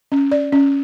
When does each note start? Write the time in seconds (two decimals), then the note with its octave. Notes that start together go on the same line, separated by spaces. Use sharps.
0.12 C#4
0.32 D5
0.52 C#4